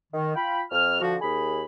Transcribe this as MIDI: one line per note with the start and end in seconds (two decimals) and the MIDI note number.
0.13 0.33 51
0.35 0.62 65
0.35 0.62 79
0.35 0.62 83
0.71 1.00 41
0.71 1.00 89
1.01 1.16 50
1.01 1.16 53
1.01 1.16 66
1.21 1.64 39
1.21 1.64 68
1.21 1.64 83